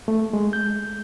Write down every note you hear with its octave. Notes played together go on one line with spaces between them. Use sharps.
A3
G#3
G6